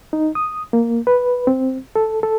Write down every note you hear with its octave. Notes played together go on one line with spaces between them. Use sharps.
D#4
D#6
A#3
B4
C4
A4
A4